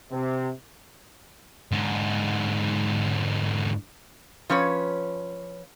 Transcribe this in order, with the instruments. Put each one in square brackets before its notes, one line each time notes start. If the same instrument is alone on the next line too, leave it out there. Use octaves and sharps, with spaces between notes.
[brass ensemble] C3
[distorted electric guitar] G#2 D3
[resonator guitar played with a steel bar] F3 C#4 B4 C#5